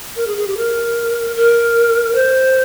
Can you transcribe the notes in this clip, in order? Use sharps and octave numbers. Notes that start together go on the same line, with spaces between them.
A#4
G#4
G#4
G4
A#4
A#4
C5